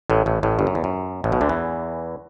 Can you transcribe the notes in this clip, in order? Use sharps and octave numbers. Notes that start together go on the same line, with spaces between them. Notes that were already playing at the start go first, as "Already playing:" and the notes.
A1 A2
A1 A2
A1 A2
G1 G2
F#2
E2
F#2
A1 A2
B1 B2
D2 D3
E2 E3